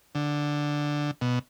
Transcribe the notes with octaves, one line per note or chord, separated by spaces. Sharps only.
D3
B2